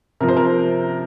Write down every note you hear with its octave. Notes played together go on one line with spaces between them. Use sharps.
C3 F3 A#4
C5
A#4